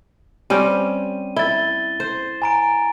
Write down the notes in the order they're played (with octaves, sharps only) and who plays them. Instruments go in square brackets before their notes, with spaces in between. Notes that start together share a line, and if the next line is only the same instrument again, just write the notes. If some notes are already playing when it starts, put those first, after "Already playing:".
[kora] G3 C4 C#4 [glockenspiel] D#7
[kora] E4 [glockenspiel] A6 G7
[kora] C5
[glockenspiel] G#5 A#5 D7